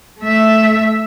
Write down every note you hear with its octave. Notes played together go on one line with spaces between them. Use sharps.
A3 E5